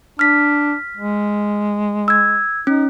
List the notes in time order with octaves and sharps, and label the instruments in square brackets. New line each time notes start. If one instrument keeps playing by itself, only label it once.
[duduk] D4 [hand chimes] F6 B6
[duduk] G#3
[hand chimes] E6 G#6
[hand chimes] C#4 [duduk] D#4